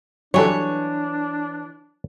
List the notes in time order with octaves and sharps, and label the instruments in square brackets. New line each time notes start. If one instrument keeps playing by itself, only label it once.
[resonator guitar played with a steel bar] E3 C#5 [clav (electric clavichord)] F#3 G3 A4 [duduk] D4